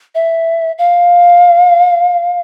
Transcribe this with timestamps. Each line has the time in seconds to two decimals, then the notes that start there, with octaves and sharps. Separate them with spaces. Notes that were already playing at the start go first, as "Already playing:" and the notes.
0.15 E5
0.78 F5